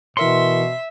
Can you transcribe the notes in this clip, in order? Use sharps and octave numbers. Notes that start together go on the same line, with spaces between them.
B2 E3 A#4 E5 C6 C#7